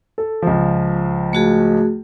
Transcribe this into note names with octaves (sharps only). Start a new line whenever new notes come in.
A4
C#2 F3
A3 F#4 G#4